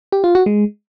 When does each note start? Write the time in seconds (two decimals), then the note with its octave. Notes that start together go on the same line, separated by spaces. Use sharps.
0.12 G4
0.24 F4
0.35 F#4
0.46 G#3